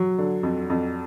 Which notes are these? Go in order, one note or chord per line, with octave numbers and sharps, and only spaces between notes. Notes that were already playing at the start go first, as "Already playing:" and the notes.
Already playing: F#3
D3
F2
F2